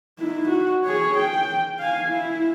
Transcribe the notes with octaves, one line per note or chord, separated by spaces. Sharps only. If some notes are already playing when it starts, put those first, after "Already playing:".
D#4 E4
F#4
G#4 C#5
G5
F5 G#5
E4